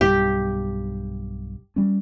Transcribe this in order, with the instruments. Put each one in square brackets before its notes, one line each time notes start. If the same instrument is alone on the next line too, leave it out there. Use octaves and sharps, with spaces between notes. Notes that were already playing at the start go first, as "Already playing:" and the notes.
[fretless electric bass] B1 G2 [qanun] G4
[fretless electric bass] G3 C#4